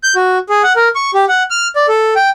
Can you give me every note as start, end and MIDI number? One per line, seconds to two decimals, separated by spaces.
0.03 0.14 91
0.16 0.38 66
0.49 0.62 68
0.63 0.73 78
0.76 0.88 70
0.95 1.11 85
1.14 1.25 67
1.29 1.43 78
1.50 1.68 89
1.76 1.86 74
1.88 2.14 69
2.16 2.30 79